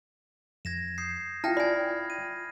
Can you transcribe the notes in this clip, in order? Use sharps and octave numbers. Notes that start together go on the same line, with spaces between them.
F2 G#6 A#6 E7
D#6 G6 C7
E4 F4 G5 A5 F6 A#6
D5 G#5 B5 G#6
D#7